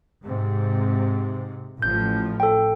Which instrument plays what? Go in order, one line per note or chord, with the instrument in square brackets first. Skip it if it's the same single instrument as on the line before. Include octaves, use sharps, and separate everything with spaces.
[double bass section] G#2 C3
[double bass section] A1 A2 F3 [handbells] G6
[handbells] A4 G5